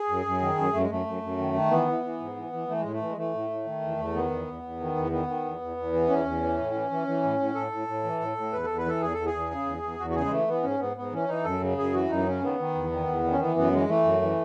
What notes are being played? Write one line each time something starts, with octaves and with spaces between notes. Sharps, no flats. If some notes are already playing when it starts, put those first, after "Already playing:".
Already playing: G#4
F#2
F#2
D#3
F#2
F#2 A3
G#3
F#2 A3
F#2
F#2
D#3
D#3
E3 B3
E3
E3
G#2
E3
E3
E3 A3
A2 G#3
A3
E3
G#3
E3 A3
A2
A2
D#3
E2
E2
D#3 B3
E2
E2
E2
D#3
E2
D#3 B3
D#3
E2
E2
E2
E3
E2 C#4
E2
E3
A2
E3
E3
E3
A2
A2
A2 A4
A2
A2
E3
A2
A2
E2 B4
E2 A4
B4
E3 A4
E2 G#4
E2 A4
G#4
E2
C#3
E2
E2
E2 F#4
F#4
C#3 G#4
G#3
E3 A3
E3 B3
G#2 C#4
G#2 B3
G#2 B3
E3 C#4
E3 D#4
F#2 A4
C#3
F#2 G#4
E3 F#4
F#2 D#4
C#3 C#4
D#3 B3
D#3
E2
D#3
E2
D#3
C#4
E3 B3
F#2 B3
E3 G#3
E3 A3
F#2
E3